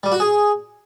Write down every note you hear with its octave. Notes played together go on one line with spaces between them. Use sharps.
G3
F#4
G#4